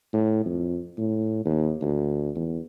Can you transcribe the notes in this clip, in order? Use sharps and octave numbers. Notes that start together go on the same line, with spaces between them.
A2
F2
A2
D#2
D2
E2